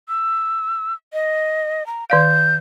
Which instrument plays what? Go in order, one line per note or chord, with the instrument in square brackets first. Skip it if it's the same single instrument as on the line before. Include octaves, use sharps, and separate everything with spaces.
[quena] E6
D#5
A#5
[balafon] D#3 D5 F5 [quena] G6